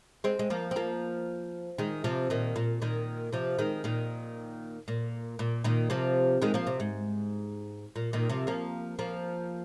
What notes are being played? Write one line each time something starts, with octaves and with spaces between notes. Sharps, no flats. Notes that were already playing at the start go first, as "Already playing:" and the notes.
G#3 C4
G#3
F3 A#3
C4
F3 A#3
D#3 G#3
C3 F3
A#2 D#3
A#2
A#2 D#3
C3 F3
D#3 G#3
A#2 D#3
A#2
A#2
A#2 D#3
C3 F3
D#3 G#3
F3 A#3
C3
G#2
A#2
A#2 D#3
C3 F3
F3 A#3
F3 A#3